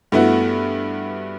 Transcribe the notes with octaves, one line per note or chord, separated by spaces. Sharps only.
G2 A3 B3 E4 F#4